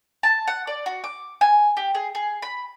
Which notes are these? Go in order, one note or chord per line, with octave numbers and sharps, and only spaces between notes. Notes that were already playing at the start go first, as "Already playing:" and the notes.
A5
F#5
D5
F#4
D6
G#5
G4
G#4
G#4
B5